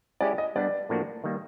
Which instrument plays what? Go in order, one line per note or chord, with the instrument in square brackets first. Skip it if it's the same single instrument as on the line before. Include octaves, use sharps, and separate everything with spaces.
[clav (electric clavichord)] G#3 C#4 E4 G4 [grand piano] D5
[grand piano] D#5
[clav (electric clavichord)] G3 B3 D4 [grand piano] D5
[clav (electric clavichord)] A2 F3 A#3 D4 F#4
D#3 G3 A#3